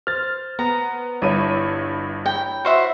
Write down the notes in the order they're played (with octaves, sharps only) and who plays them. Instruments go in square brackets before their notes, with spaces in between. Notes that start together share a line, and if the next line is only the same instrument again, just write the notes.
[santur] C5 [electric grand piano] F6 A6
[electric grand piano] B3 [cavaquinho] A#5
[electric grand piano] G1 G2 D#7 [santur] E4 C#5 E5
[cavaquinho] G5 [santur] A#5
[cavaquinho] F#4 C5 E5